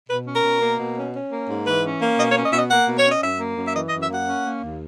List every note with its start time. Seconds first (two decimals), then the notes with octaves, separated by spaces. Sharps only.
0.09 B2 B4
0.27 C#4
0.36 A#4
0.44 B2
0.62 A#3
0.79 B2
0.96 C#4
1.14 C#4
1.31 A#3
1.50 G#2
1.67 E3 B4
1.84 C#4
2.02 A#3
2.18 B2 D#5
2.31 C#5
2.37 C#4
2.45 D#5
2.52 B2 E5
2.58 D#5
2.71 A#3 F#5
2.88 B2
2.97 C#5
3.06 C#4 D#5
3.23 F#2 E5
3.40 A#3
3.57 F#2
3.68 E5
3.75 E3 D#5
3.89 D#5
3.93 F#2
4.01 E5
4.10 A#3 F#5
4.28 C#4
4.46 A#3
4.62 D#2